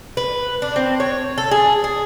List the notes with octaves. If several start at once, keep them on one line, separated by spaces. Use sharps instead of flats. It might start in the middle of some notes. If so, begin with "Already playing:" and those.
B4
D4
C4
C#5
A4
G#4
G#4